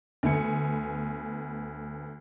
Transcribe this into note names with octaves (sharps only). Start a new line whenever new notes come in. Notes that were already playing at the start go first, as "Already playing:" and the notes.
D2 B3 G#5 C#7